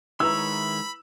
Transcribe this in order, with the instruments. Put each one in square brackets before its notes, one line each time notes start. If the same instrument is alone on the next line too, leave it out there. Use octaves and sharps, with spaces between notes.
[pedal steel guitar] D#3 G#3 C#5 [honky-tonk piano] E4 B4 A#5 [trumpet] B5 [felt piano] E6